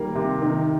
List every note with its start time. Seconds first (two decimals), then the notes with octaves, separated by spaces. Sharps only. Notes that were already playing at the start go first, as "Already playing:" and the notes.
Already playing: D#3 G3 A#3
0.15 C3
0.42 D#3